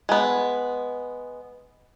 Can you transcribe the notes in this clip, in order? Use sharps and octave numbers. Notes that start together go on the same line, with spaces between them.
G#3 B3